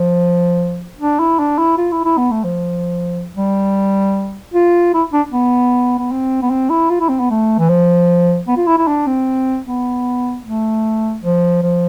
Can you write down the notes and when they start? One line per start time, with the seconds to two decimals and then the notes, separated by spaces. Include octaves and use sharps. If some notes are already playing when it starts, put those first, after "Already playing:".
Already playing: F3
0.99 D4
1.19 E4
1.39 D4
1.58 E4
1.77 F4
1.92 E4
2.05 E4
2.17 B3
2.31 A3
2.44 F3
3.36 G3
4.54 F4
4.94 E4
5.13 D4
5.32 B3
5.99 B3
6.11 C4
6.42 B3
6.50 C4
6.70 E4
6.90 F4
7.00 E4
7.09 C4
7.20 B3
7.30 A3
7.58 E3
7.69 F3
8.48 B3
8.57 F4
8.67 E4
8.78 E4
8.87 D4
9.07 C4
9.67 B3
10.44 A3
11.23 F3
11.62 F3